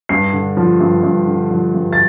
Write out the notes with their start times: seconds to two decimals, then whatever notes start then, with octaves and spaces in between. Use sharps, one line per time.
0.09 G2 C7
0.33 D3
0.57 F3
0.81 G2
1.04 G2
1.27 D3
1.51 F3
1.74 G2
1.93 A6